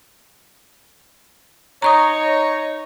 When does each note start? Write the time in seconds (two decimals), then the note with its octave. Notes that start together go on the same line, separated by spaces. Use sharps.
1.82 D#4 C#5 A#5 C#6 D#6